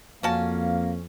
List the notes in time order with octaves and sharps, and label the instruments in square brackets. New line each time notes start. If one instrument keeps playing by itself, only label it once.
[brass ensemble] F2 [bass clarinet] A#3 [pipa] C#4 F#4 A5 [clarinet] F5